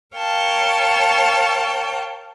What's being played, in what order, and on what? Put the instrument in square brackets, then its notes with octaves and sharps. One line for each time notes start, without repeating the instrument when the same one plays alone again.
[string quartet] A#4 C#5 F5 G5 A5